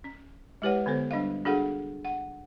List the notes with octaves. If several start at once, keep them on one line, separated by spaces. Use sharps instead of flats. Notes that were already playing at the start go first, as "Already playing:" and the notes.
C#4
G#3 E4 G4 B4 C#5 F#5
D3 B3 A4 C5
G3 D4 D#5 F5
D4 F#4 G#4 A4 F5 F#5
F#5